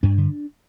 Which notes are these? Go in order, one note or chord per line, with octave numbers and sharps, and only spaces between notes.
G2 D4
D3